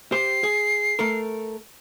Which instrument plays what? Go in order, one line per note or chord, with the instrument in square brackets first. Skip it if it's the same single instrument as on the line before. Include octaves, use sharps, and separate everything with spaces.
[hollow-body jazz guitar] G4 C5 [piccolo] C7
[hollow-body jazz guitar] G#4
A3 A4 A#4